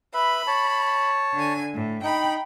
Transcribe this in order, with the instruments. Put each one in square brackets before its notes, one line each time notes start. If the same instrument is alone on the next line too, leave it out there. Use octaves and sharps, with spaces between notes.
[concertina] B4 E5 [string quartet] B5
[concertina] C#5 A5
[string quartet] D3 G#5
A2
[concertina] D#4 [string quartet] G5 B5